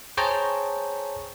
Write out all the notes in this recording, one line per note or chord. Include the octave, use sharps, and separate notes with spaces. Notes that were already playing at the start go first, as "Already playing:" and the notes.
G#4 C5 C#5 G5 A5 A#5